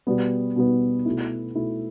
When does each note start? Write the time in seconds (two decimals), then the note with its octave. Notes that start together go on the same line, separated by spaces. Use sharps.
0.07 B2 G3 B3
0.56 B2 G3 B3
1.05 B2 A3 E4
1.55 B2 A3 E4